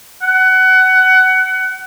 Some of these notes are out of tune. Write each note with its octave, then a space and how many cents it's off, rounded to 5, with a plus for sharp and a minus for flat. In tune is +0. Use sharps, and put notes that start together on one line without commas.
F#5 +20